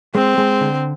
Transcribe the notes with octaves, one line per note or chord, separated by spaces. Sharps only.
G#3 C4
G#3
D3